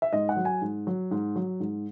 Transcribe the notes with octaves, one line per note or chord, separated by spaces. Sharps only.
E5
G#2 D#5
F#5
F#3
G#5
G#2
F#3
G#2
F#3
G#2